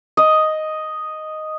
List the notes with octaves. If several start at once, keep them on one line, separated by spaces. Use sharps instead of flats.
D#5